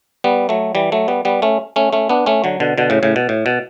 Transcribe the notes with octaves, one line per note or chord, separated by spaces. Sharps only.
G3 B3
F#3 A3
E3 G3
F#3 A3
G3 B3
G3 B3
A3 C#4
A3 C#4
A3 C#4
B3 D4
A3 C#4
D3 F#3
B2 D3
B2 D3
A2 C#3
A2 C#3
B2
A2
B2